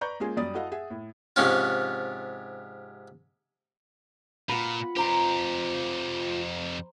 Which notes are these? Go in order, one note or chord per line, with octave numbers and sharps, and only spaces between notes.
B4 D5 A#5 B5 C#6 G6
G#3 A#3 C#4 F4 G#4 G#5
F#2 G3 D5 D#6 A6
E4 F#4 A4 D#5 F5 F#5
G#4 E5 F#5
A2
G#2 C3 F3 C#4 F4
A#2 F4 F#5 B5
F2 G4 C5 A#5 C6